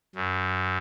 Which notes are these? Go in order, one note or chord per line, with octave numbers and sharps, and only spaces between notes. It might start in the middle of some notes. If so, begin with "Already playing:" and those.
F#2